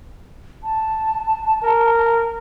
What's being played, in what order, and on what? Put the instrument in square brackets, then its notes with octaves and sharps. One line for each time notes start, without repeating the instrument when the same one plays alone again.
[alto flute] A5
[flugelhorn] A#4